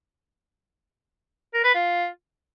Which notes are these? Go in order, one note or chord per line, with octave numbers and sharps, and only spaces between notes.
A#4
B4
F4